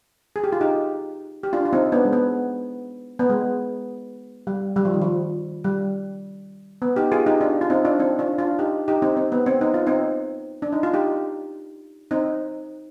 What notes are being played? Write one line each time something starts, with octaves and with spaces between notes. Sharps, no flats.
G#4
G4
F4
D#4 G4
G4
D4 F4
F4
C4 D#4
B3 D4
G#3
B3
B3
G#3
G3
G3
F3
D#3
F3
G3
B3
D#4 G4
F4 G#4
D#4 G4
D4 F4
F4
C4 D#4
D4 F4
C4 D#4
D4 F4
D4 F4
D#4 G4
D#4 G4
C4 D#4
C4
B3
C4
D#4
F4
C4 D#4
D4
D#4
F4
D#4 G4
C4 D#4